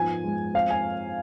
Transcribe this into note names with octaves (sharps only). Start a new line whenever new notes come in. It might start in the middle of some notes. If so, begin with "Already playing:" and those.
Already playing: G#2 F3 B3 G#5
G#3
C4 F5
G#5